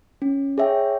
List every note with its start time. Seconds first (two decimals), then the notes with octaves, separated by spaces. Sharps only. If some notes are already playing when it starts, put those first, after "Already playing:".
0.22 C#4
0.58 G#4 C#5 E5 G5